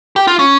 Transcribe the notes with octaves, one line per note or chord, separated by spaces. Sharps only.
G4
F4
C#4